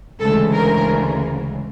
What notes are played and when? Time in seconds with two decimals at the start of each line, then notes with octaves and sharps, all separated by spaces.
0.20 D2 C#3 E3 G#3 A4
0.53 A#4